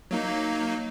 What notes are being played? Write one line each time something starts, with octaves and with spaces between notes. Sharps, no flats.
F#3 A#3 D#4